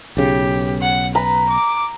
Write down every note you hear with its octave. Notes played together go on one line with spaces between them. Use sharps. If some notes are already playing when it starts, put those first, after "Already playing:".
B1 C#3 G4
F#5
B4 A#5
D6